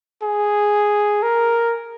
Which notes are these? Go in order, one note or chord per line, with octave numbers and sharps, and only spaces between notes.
G#4
A#4